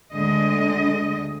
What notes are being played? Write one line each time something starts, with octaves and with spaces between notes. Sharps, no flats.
D2 D3 G#3 D#5